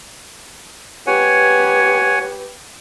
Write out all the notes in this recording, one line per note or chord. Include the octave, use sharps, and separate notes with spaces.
G4 B4 C#5 F#5 G#5